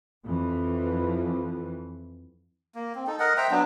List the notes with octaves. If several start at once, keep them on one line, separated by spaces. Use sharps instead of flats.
F2 E3
A#3
C4
D#4 A4
A#4 D#5 F#5
C5 E5 G5 A#5
F#3 B3 D4